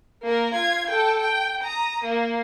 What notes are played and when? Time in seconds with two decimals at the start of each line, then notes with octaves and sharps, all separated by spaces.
0.23 A#3 A#4
0.54 F4 G#6
0.89 A4 G5
1.20 G5
1.63 A#5 D#6
2.04 A#3